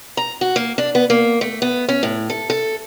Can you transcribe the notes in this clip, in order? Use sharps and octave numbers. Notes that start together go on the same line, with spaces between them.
A#5
F#4
A#3
D4
B3
A#3
A3
B3
C#4
A2
A4
A4